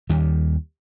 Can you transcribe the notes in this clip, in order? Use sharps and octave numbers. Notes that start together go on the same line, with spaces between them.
D#2 D#3 G3